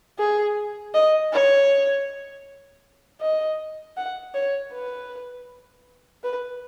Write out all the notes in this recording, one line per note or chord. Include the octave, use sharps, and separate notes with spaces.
G#4
D#5
C#5
D#5
F#5
C#5
B4
B4